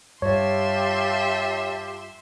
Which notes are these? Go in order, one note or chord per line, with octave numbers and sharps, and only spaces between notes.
G2 F4 G4 C#5 E5 A5 C6